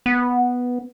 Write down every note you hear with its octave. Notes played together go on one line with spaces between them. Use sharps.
B3